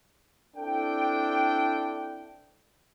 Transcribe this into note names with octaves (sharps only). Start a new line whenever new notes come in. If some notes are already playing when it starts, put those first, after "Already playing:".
C4 D4 E4 A4 G5